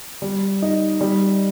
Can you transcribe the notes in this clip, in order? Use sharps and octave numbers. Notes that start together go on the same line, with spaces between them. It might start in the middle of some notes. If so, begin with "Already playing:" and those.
G3
D#4
G3